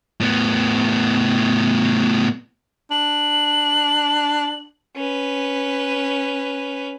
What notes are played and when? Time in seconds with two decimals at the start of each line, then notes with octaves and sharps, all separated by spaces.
0.20 A2 B3
2.91 D4 F#7
4.96 C#4 B4